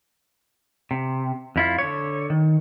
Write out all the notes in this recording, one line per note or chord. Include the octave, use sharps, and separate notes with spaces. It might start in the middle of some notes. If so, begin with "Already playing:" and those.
C3
F2 E4 F4
D3 C#5
D#3